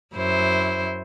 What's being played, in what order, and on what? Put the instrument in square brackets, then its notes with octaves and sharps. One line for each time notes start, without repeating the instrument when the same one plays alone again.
[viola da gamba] F#2 E4 C5